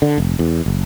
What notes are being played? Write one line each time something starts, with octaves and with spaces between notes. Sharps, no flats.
D3
F1
E2
F#1